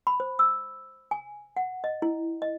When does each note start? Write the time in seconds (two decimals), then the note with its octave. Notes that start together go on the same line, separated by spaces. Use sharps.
0.07 B5
0.20 C5
0.39 E6
1.11 G#5
1.57 F#5
1.84 D#5
2.02 E4
2.42 D#5